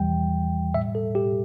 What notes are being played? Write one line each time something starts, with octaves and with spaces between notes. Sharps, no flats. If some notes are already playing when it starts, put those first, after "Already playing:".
Already playing: E2 E3 G3 G5
A2 G3 E5
A4
G4